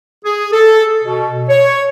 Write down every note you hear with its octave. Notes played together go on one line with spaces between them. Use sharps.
G#4
A4
B2
C#5